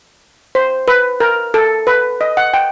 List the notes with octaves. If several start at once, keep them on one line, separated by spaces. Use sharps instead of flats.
C5
B4
A#4
A4
B4
D#5
F#5
G5